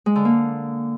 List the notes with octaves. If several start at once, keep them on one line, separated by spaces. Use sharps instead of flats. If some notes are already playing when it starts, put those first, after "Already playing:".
G#3
D3
A#3